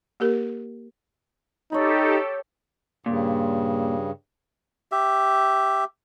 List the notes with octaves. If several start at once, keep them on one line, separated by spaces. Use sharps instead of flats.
A#3 G4 A#4
D#4 G4 A4 C#5 B5
G2 A#2 C#3
G4 E5